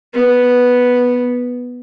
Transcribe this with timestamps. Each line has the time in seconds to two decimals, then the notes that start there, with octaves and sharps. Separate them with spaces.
0.14 B3